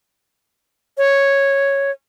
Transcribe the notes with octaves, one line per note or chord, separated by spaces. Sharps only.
C#5